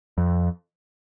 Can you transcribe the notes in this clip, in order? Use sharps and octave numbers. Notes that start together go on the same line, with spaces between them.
F2